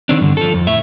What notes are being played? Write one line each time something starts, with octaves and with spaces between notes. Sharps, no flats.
D#3 C4 D4
G2 D3
F3 A4
F2
A2 E5